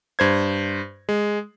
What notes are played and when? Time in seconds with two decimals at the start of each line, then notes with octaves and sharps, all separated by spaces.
0.19 G2 C5 G#6
1.09 G#3